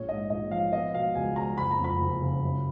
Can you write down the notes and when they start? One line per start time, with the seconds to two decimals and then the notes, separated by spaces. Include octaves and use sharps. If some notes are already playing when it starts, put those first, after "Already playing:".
Already playing: A#1 C#5
0.09 G#2 D#5
0.30 A#1 D#5
0.51 F3 F5
0.72 B3 D#5
0.94 B2 F5
1.15 C#2 G#5
1.36 G#3 A#5
1.57 F#1 B5
1.71 A#5
1.79 F2
1.84 B5
2.01 F#1
2.22 C#3
2.43 F#2